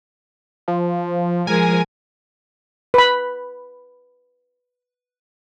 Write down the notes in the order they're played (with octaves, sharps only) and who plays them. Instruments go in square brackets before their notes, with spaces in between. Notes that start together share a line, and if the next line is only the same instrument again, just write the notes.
[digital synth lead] F3
[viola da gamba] F3 G#3 A#4 [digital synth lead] G#5
[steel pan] B4 B5